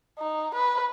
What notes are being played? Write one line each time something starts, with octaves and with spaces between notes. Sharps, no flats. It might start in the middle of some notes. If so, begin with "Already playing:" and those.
D#4
B4